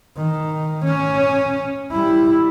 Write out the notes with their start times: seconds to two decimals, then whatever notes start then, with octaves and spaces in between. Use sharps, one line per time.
0.17 D#3
0.86 C#4
1.91 G3 E4